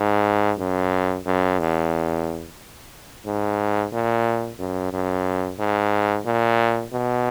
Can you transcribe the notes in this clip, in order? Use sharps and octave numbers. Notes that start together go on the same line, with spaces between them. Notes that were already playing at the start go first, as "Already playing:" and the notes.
Already playing: G#2
F#2
F#2
E2
G#2
A#2
F#2
F#2
G#2
A#2
B2